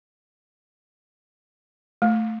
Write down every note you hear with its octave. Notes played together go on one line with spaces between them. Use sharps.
A3